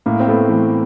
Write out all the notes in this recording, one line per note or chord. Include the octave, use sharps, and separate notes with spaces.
A2 A#3
C4
A3 B3
E3 A3